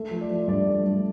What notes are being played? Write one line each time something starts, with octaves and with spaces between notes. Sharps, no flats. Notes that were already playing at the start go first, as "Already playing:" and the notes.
Already playing: A3
F3
D5
F3
G2 D5
A3
G2